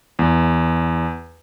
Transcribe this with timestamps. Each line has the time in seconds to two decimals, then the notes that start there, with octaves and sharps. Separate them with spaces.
0.19 E2